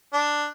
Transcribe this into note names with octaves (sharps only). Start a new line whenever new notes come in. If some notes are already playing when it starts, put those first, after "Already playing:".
D4